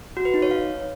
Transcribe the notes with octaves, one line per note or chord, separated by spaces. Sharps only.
F#4
B4
D#4
C#5
F5